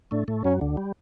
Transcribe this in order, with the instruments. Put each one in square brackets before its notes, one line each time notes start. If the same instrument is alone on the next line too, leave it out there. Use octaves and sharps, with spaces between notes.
[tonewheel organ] A2 A3 [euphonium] D4
[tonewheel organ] A2 A3
[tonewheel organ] F#2 F#3 [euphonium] C#4
[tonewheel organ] D2 D3
G3